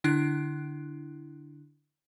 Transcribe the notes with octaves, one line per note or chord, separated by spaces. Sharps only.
D3 D4 E4 F#6